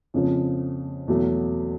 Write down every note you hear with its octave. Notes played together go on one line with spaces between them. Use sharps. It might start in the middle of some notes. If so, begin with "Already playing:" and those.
F2 C#3 F3
E2 B2 F#3 A3